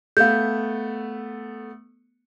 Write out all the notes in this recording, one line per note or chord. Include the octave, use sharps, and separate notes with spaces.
A3 B3 F5 G6